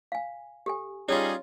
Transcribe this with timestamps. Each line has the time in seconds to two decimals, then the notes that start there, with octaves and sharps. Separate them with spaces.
0.12 F5 G#5
0.66 G4 A4 G#5
1.09 G3 C#4 D#4 F4 G#4 C#5